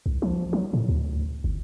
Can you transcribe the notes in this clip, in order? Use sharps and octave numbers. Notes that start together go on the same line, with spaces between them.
C2
F3
F#3
A2
D2
G1